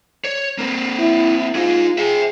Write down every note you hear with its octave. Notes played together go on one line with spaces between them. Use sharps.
C#5
A#3 C4
E4
D#4 F4 G#4
G#4 E5 G5